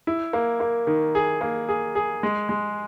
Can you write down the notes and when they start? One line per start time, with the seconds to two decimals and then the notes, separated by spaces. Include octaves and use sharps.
0.07 E4
0.33 A#3
0.60 A#3
0.87 D#3
1.15 G#4
1.41 A#3
1.68 G#4
1.95 G#4
2.23 G#3
2.49 G#3